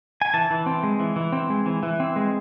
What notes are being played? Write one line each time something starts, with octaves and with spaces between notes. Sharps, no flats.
G#5
E3 A5
E3
C4
G#3
E3
E3
C4
G#3
E3
E3
C4
G#3